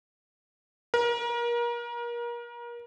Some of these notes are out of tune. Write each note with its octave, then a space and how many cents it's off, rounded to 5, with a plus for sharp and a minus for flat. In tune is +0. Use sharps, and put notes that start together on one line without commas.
A#4 +30